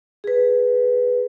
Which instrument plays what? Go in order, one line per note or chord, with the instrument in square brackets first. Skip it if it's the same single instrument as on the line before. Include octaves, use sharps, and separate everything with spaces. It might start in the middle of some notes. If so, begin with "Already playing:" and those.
[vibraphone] G#4 B4